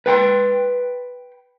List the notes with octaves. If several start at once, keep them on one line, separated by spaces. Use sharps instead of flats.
B4 G5 B5 C6